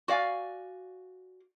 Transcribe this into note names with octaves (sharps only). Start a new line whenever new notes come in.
F#4 D5 F5 G#5